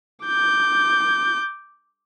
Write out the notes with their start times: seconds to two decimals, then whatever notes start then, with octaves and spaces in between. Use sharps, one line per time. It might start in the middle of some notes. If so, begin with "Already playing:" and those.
0.25 D6 G6